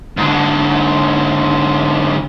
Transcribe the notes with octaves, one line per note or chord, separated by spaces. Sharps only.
G#2 D3